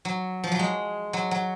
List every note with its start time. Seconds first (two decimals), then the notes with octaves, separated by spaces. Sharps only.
0.05 F#3
0.44 F3
0.52 F#3
0.59 G#3
1.13 F#3
1.31 F#3